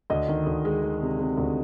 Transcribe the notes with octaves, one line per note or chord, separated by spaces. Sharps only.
D2 D#5
D#3
D2
G#3
D#3
C3
C3
D2